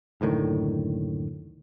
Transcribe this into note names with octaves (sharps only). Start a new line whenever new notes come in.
F#1 D2 A2 D#3